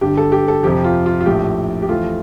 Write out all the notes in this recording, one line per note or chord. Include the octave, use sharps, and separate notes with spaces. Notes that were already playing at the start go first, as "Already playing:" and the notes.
G1 G2 D3 G4
A4
G4
A4
F2 C3 F3 G4
F4
F4
F4
A#1 A2 F3 G4
G4
F2 E3 A3 F4